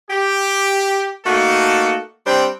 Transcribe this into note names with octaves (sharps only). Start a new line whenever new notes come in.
G4
A3 A#3 D#4 F#4 A4
G3 C4 D4 C5 G5